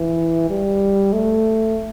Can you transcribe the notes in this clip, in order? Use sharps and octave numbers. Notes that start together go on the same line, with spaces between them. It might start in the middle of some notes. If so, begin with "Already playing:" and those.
Already playing: E3
G3
A3